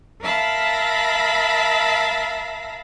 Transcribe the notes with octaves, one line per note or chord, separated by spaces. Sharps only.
A#4 E5 F5 A5 B5 A#6